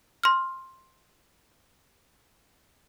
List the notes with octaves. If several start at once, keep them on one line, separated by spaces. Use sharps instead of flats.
C6 F6